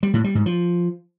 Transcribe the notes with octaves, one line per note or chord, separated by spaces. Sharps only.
G3
A2
G3
G#2
F3